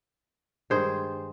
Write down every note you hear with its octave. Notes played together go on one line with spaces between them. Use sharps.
G2 D#3 G#3 G#4 C5